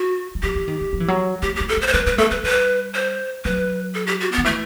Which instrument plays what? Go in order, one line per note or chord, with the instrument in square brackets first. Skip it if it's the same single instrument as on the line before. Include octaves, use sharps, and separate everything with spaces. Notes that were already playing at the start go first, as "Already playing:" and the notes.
Already playing: [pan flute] F#4
[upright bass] G3
[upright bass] F#3 [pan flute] G4
[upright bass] E3
D#3
E3
F#3
E3
F#3
[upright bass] A3 [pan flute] G4
[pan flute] G4
[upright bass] A3
[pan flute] A4
[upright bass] A3 [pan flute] C5
[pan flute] C5
[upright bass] G3 [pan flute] B4
[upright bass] G3 [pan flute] B4
[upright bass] A3 [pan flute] A4
[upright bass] G3 [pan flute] B4
[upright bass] G3 [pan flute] B4
[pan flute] C5
[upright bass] F#3 [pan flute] B4
[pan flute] A4
G4
F#4
B3
[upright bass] D#3
[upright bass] E3 [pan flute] A3